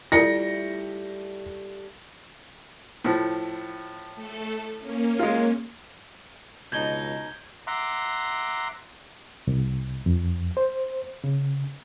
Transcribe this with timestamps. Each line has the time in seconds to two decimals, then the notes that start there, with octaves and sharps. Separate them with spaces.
0.12 G3 A3 E4 F4 A4 A#6 C#7
3.05 A2 F3
4.15 A3 A4
4.80 A#3 C#4
5.19 G#3 F4
6.72 C#2 B2 D#4 G6 G#6 G7
7.67 E5 F#5 A#5 C6 D6
9.47 C2
10.06 F2
10.57 C5
11.24 C#3